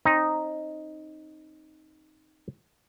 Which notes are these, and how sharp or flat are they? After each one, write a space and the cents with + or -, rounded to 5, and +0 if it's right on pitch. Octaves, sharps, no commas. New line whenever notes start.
C4 +25 D#4 +0